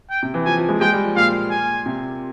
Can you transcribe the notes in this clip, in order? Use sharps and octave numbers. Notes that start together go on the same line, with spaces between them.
G5
C3
E3
F3 G#5
F3
G#3
G#3 G5
G3
F3
A#2 F5
G#5
C3